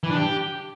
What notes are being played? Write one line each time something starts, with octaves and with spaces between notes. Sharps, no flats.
E3
D4
G4